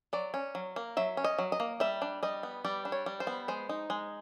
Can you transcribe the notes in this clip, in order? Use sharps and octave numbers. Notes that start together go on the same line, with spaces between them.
F#3 D5
C#4
F#3
A#3
F#3 E5
C#4
D#5
F#3
D#5
A#3
G3 E5
D4
G3 D#5
B3
G3 D5
D4
C#5
G3
C5
B3
G#3 C5
D#4
G#3